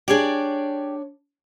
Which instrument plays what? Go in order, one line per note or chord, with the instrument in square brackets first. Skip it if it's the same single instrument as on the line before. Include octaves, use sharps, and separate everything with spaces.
[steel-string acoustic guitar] D4 C#5 D5 [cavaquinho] G4 G#4